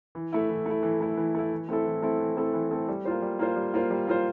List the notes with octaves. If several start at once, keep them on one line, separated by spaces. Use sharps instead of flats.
E3
A3 E4
E3
A3 E4
E3
A3 E4
E3
A3 E4
E3
A3 C4 E4 A4
E3
A3 C4 E4 A4
E3
A3 C4 E4 A4
E3
A3 C4 E4 A4
G3
A#3 F4 C5
G3
A#3 F4 C5
G3
A#3 F4 C5
G3
A#3 F4 C5